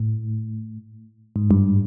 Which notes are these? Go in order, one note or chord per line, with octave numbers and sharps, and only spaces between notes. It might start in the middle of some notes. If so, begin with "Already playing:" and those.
Already playing: A2
G#2
G2